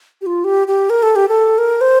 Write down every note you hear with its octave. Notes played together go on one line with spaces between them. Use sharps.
G4
F4
G4
G4
A#4
A4
G4
A4
A#4
C5